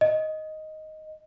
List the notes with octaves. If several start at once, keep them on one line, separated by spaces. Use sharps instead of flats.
D#5